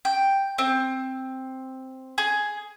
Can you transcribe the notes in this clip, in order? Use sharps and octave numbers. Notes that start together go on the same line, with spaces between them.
G5
C4
G#4